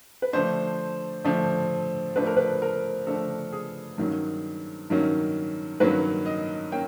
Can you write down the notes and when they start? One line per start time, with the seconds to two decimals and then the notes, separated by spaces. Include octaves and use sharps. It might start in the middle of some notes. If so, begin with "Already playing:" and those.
0.22 B4
0.33 D3 F3 A3 D4 C5
1.24 D3 F3 A3 D4
2.16 D3 F3 A3 D4 B4
2.27 A#4
2.37 B4
2.62 A#4
3.07 D3 F3 A3 D4 A4
3.52 G#4
3.98 G2 D#3 F#3 A#3 C#4
4.90 G2 D#3 F#3 A#3 C#4
5.80 G2 D#3 F#3 A#3 C#4 B4
6.26 D#5
6.72 A#3 C#4 G5